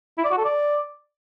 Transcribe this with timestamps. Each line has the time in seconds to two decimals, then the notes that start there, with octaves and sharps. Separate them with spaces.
0.18 E4
0.24 D5
0.31 F#4
0.38 A4
0.44 D5